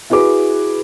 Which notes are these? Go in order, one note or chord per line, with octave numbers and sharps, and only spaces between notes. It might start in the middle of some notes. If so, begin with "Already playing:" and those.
E4 F#4 G#4 B4 D6